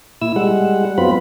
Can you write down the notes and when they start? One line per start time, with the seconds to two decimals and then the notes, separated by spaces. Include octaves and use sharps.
0.21 A#2 E4 E6
0.36 G3 G#3 F#5
0.98 F#2 F#3 B3 C4 F4 B5